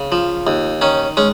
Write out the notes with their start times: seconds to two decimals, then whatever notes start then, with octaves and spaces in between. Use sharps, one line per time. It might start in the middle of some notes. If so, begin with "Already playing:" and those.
Already playing: C#3
0.12 F3
0.47 D#2
0.81 D#3 C#4
1.17 G#3 C#4